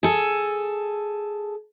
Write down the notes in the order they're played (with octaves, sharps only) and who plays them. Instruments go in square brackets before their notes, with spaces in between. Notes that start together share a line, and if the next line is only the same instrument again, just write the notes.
[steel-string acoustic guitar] G#4 A4